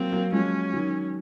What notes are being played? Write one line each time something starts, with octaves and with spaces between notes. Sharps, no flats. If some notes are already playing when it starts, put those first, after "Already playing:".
Already playing: F#3 A#3 C4
F#3 A#3
F3 G#3 C#4
D#3 F#3